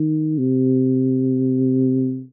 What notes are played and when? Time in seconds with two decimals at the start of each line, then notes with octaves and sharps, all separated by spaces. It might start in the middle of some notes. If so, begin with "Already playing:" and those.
Already playing: D#3
0.38 C3